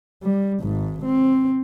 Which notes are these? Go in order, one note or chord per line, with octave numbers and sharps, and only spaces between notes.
G3
G#1 G#2
C4